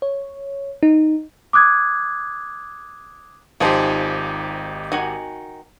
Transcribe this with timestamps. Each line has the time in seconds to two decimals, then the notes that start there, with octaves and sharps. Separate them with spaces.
0.02 C#5
0.83 D#4
1.53 D6 D#6 F#6 G#6
3.60 G#1 F3 D#4 G4 G#4 C5
4.92 D#3 F#4 G#5